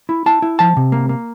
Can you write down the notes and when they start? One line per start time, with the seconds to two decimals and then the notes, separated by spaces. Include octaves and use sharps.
0.09 E4
0.26 E4 A5
0.42 E4
0.59 F3 A5
0.77 C3
0.92 A#3
1.09 A#3